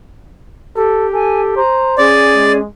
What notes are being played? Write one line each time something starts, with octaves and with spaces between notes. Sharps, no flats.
G4 A4
A4 G#5
C5 A#5
C#4 G#4 D5
G#3